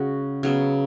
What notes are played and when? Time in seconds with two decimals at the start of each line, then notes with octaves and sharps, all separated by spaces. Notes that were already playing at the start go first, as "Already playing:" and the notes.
Already playing: C#3 G#3 F#4
0.43 C#3 F#3 B3